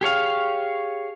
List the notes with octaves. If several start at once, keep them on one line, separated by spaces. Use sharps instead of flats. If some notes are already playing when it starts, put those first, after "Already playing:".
G4 G#4 C#5 F5